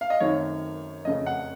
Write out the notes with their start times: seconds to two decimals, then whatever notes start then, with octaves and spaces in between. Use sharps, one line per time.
0.01 F5
0.10 D#5
0.20 F#2 D#3 A3 C4 C#5
1.05 F2 C#3 A3 D#5
1.26 F#5